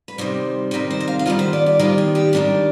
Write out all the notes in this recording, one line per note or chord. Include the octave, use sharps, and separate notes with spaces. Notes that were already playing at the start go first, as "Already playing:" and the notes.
B4
C3 D#3 G3 C5
C3 D#3 G3 B4
C5
D#5
F5
F5
D#3 G3 B3 F4 D#5
C5
D5
D5
D#3 G3 B3 F4 C5
G#4
G4
D#3 G3 D4 F4 G4